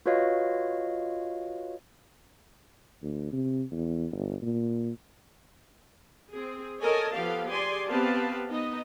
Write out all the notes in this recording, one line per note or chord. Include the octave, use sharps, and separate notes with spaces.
F4 F#4 B4 C#5 D#5 F5
D2
C3
E2
G1
A#2
C4 G#4
A4 A#4 C#5 D#5 G#5 A5
F3 B3 G4 A4 F5
G4 G#4 D5 G#5 C6
B3 C4 G4 B4 F5 A5
B3 D#4 D#5